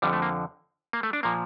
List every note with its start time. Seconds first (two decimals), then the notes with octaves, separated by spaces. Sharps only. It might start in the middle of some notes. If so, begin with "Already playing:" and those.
0.02 F2 D3 F3 G3
0.13 A3
0.22 A#3
0.93 A#3
1.03 A3
1.13 D4
1.23 A#2 F3 A#3